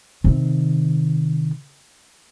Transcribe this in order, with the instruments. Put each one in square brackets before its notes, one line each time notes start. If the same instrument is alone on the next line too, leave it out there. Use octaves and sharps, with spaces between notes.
[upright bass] C3 D#3